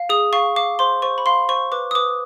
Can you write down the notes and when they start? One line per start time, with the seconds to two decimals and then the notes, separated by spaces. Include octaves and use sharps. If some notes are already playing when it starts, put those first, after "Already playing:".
Already playing: F5
0.09 G#4 D#6
0.33 F5 C#6
0.56 F5 D6
0.79 C5 C6
1.02 C5 C#6
1.18 B5
1.26 F5 C6
1.49 C5 C#6
1.72 B4 D6
1.91 D#6
1.95 B4 D6